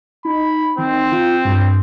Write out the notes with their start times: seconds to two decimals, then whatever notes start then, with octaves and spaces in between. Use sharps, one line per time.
0.25 D#4 B5
0.78 D#3 C4
1.12 F4
1.45 G2